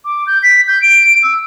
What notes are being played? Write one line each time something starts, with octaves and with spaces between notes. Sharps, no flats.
D6
G6
B6
G6
D7
E6